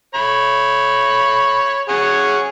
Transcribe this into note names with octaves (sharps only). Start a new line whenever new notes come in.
C#5 B5
G#4 C#5 F#5